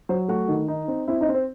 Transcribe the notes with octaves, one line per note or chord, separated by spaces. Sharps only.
F#3 C5
A3 F#4 F#5
D#3
D#4
C4
C4 E4 E5
D#4 D#5
C4
C5